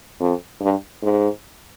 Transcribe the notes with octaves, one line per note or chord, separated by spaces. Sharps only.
F2
G2
G#2